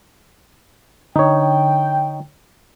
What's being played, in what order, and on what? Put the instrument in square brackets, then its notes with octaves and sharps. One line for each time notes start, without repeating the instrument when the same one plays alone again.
[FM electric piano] D3 [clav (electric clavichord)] D#4 C#5 [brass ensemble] G5